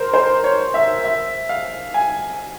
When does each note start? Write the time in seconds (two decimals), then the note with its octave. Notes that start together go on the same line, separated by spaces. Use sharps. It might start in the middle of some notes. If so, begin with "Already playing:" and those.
Already playing: A#4 C5
0.14 C5
0.44 C#5
0.74 E5
1.04 E5
1.49 F5
1.94 G#5